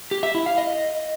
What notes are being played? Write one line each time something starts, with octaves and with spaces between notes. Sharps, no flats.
G4
E5
E4
F5
D#5